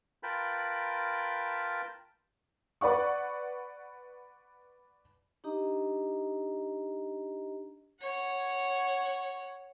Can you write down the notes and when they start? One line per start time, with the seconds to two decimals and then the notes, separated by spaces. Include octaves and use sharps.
0.23 F4 A#4 B4 G5 A5 B5
2.81 B4 D5 F#5 C#6
5.44 D4 D#4 G4 D#5 A#5
8.03 C#5 F#5